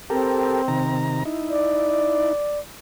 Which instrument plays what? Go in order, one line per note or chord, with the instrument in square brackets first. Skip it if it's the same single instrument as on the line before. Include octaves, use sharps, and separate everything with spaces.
[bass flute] C4 [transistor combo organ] G4 A4 A#4
[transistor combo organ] C3 D#3 A#5
D#4 E4
[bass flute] D5